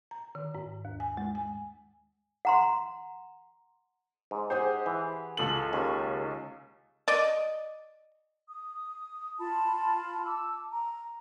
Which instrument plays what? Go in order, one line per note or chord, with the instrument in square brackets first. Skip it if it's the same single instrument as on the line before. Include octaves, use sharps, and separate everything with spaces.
[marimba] A#5
D#3
G#2
D#2
G#5
G#3
G#5
[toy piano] F#5 A#5 C6
[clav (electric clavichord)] G#2
[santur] G4 G#4 F#5 [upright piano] C5
[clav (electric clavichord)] E3
[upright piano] C#2 A4 F#7
[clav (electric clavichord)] D#2 [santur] C#4 C#5
[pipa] D5 D#5
[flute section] D#6
F4 A5 B5
A5 D6 E6
A#5